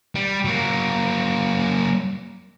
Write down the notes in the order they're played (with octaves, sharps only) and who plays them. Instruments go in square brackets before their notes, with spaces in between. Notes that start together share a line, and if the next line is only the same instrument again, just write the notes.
[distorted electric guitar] G3
F#3 A#3